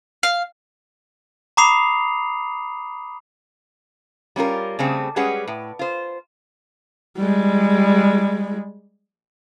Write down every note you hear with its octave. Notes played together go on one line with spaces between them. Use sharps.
F5
A#5 B5 D6 D#6 C7 F7
G3 C#4 F4 A#4
C#3 G3 A3 C4 G#4
G3 G#3 C#4 G#4 B4 F#5
A2
F4 C5
G3 G#3